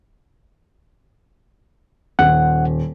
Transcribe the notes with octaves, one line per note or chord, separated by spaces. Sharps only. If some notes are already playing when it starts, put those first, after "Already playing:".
D#1 F#5